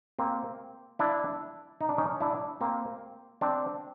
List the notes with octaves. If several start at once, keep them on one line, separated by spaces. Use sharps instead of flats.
A#3 C4
D4 E4
D#4
D4
C#4 D#4
D4 E4
A#3 C4
C4 D4